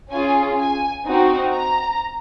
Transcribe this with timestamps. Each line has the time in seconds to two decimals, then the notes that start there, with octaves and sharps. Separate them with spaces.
0.11 C#4 F4 G#4 G#5
0.59 G#5
1.06 C4 D#4 F#4
1.54 A#5